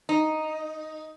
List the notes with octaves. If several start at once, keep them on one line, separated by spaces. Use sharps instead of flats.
D#4